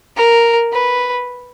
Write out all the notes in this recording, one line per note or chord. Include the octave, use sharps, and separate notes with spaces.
A#4
B4